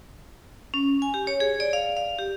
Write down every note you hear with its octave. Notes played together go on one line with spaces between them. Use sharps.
C#4
G#5
G4
C#5
G#4
D5
F5
F5
G4